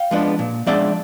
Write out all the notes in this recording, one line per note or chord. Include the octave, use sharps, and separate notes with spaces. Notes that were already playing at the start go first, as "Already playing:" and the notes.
Already playing: F5 G5
F3 G#3 B3 D4
A#2
F3 G#3 B3 D4 D5 E5